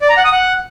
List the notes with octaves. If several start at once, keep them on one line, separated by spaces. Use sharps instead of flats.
D5
A#5
F#5
D#6
F#5